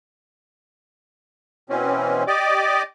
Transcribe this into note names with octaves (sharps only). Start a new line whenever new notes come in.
B2 E3 C4 C#4
G4 D5 D#5 D6